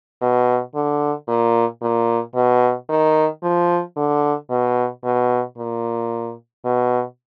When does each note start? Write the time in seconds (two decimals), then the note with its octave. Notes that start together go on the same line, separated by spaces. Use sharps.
0.21 B2
0.75 D3
1.27 A#2
1.82 A#2
2.35 B2
2.89 D#3
3.43 F3
3.96 D3
4.50 B2
5.04 B2
5.57 A#2
6.65 B2